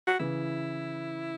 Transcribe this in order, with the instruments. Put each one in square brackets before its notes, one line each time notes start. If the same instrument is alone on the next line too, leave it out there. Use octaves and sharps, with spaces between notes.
[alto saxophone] F#4
[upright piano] C#3 E3 [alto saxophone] E4